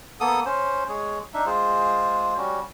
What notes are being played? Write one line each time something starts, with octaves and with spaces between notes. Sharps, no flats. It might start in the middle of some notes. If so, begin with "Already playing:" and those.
A#3 B3 A4 D#6
C#4 C5
G#3 G#4 C#5
D4 D#4 E5
G#3 F4 G#4 C5
G3 C#4 F#4